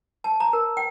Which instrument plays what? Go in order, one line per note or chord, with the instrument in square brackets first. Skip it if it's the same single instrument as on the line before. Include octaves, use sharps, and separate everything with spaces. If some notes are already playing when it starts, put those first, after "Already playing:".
[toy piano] A5
A#5
A#4
G5